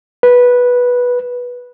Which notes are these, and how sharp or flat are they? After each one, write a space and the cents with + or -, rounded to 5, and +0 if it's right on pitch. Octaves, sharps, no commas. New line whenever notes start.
B4 -10